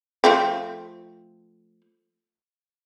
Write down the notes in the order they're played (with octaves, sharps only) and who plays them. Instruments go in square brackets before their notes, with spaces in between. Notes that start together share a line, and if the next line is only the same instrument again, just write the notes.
[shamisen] F3 A3 C4